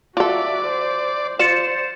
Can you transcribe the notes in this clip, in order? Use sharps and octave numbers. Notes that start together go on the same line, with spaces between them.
F4 F#4 A4 D5 E5
C5
F4 C5 D5 A6 C#7 E7